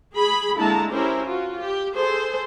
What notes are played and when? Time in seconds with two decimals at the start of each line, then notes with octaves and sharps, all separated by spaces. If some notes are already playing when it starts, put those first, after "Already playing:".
0.14 G#4 B5
0.57 D3 G#3 A#3 E4 A5 A#5
0.92 C#4 E4 G4 A#4 C5
1.26 F4 F#4
1.61 G4
1.95 G#4 A4 C5